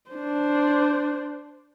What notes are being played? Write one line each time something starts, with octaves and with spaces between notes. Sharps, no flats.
D4 C5